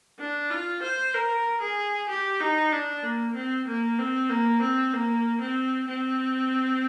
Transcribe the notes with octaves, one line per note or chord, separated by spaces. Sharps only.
D4
F4
C5
A#4
G#4
G4
D#4
D4
A#3
C4
A#3
C4
A#3
C4
A#3
C4
C4